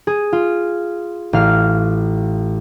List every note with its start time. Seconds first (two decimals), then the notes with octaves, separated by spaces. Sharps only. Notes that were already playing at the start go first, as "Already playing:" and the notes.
0.07 G#4
0.33 F4
1.33 A1 F5 F6